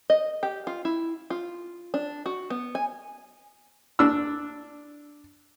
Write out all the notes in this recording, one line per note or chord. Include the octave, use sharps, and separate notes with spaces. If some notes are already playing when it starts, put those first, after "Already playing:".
D#5
G4
F4
E4
F4
D4
F#4
B3
G#5
D4 E6